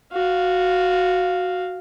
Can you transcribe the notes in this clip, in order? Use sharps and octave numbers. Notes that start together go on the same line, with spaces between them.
F#4 F5